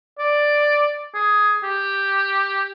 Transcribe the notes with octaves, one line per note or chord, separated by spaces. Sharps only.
D5
G#4
G4